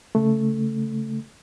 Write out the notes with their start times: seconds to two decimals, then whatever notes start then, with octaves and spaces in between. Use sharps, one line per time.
0.15 C#3 A3